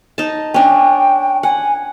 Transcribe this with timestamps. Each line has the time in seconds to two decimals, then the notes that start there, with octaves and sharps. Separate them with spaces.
0.18 D#4 A5
0.54 C#4 D4 G5
1.43 F#5 G#5